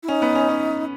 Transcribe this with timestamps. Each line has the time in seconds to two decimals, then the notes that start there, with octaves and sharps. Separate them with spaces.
0.03 E4
0.08 C#4 D#4
0.22 B3
0.35 C#4
0.49 C#4